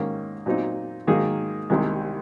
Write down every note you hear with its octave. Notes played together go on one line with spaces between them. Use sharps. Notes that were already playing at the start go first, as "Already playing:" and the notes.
Already playing: G#2 D#3 A#3 C#4
A#2 F#3 C4 D#4
G#2 D#3 F#3 A#3 D#4 G#4
C2 C3 D#3 G#3